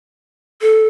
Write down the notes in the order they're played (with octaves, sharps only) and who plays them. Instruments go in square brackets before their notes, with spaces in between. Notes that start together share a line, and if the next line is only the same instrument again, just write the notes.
[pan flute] A4